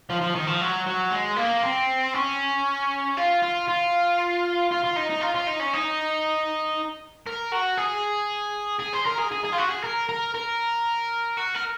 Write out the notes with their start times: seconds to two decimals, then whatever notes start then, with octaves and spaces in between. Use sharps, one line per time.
0.10 F3
0.21 F3
0.35 D#3
0.47 F3
0.61 F#3
0.87 F#3
1.11 G#3
1.37 A#3
1.63 C4
2.14 C#4
3.17 F4
3.43 F4
3.68 F4
4.71 F4
4.84 F4
4.96 D#4
5.10 D#4
5.21 F4
5.35 F4
5.47 D#4
5.60 C#4
5.73 D#4
7.27 A#4
7.52 F#4
7.78 G#4
8.80 G#4
8.94 C5
9.06 A#4
9.18 G#4
9.31 G#4
9.44 G#4
9.52 F4
9.58 F#4
9.70 G#4
9.84 A#4
10.09 A#4
10.34 A#4
11.37 F#4
11.55 A#4